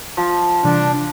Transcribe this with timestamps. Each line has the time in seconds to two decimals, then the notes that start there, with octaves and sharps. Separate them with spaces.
0.17 F3
0.64 C3 E3 G3 D4